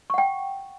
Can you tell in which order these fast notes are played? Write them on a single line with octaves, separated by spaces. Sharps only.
C#6 F#5 G5